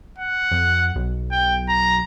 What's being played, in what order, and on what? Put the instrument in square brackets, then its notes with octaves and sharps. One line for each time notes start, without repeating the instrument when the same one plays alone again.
[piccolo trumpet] F#5
[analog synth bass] F2
B1
[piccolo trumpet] G5
A#5